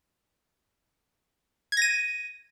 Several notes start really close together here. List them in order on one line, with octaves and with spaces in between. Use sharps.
G#6 A#6 D#7